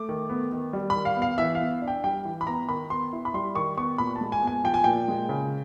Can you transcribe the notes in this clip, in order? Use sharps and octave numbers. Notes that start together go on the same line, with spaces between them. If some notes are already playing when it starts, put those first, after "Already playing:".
Already playing: A3 D6
D#3
B3
D#3
G3
B5
D#3
F5
B3
F5
E3 E5
F5
B3
D4
G5
G3 G5
E3
B5
B3 A#5
D#3 B5
B3 C6
E4
B5
G3 C6
D#3 C#6
B3 C#6
A#2 B5
A5
G#3
G#5
B3
G#5
F3 G5
G#5
A#2 G5
G#3
C#3